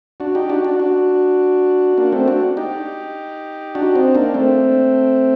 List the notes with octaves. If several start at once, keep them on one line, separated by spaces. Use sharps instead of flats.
D4 F#4
D#4 G4
D4 F#4
D4 F#4
D4 F#4
A#3 D4
A3 C4
D4 F#4
D#4 G4
D4 F#4
C4 D#4
A#3 D4
A3 C4